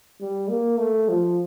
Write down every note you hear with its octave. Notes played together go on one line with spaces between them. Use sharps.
G3
A#3
A3
F3